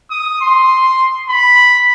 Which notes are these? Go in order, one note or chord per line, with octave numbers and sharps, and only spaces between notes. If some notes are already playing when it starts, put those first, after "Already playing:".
D#6
C6
B5